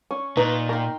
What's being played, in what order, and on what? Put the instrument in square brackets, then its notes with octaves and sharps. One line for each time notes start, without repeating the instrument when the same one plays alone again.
[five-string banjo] C#4 [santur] C#6
[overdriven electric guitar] A#2 [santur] D#4 [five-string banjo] B4
[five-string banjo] A#4 [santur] G5 C6